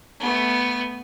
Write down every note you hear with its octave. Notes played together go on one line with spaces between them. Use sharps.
A3 B3